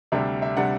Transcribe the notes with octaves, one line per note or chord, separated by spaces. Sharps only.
D2 C3 G3 D4 E5
E5
C3 G3 D4 F#5